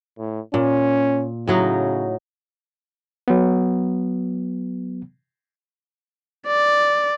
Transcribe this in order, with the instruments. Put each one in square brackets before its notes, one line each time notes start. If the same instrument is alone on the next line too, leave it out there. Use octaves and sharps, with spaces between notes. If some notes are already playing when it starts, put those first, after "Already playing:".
[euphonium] A2
[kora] A#2 [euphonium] C#4
[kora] A2 F#3 D#4 [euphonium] C#3
[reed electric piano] F#3 B3
[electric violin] D5